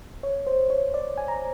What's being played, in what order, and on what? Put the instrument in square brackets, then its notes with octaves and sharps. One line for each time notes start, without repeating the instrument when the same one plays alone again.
[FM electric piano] C#5
C5
C#5
D5
G#5
A#5